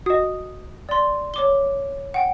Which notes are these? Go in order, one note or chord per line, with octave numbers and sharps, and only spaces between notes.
F#4 D#5 D#6
D5 C6
C#5 D6 G7
F#5 G5